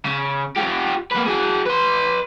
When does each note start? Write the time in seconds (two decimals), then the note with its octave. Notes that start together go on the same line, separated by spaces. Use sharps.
0.05 C#3
0.56 F4 G4
1.12 A#3 B4
1.26 F#4 G#4
1.66 B4 C6